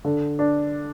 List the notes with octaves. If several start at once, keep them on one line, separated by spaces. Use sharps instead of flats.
D3
D4